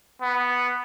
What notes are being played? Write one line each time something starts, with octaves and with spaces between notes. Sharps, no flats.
B3